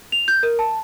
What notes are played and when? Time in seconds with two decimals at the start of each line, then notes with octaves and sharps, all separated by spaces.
0.12 F7
0.28 G6
0.43 A#4
0.59 A5